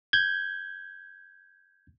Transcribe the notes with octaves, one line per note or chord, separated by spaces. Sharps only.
G6 G#6